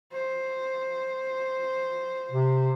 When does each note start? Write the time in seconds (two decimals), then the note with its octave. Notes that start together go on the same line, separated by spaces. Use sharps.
0.12 C5
2.31 C3